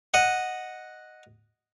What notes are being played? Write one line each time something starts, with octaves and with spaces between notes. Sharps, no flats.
D#5 F#5